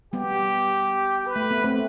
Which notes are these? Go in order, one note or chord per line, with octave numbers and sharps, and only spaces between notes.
G3 B3 G4
B4
A3
B3
A3 C4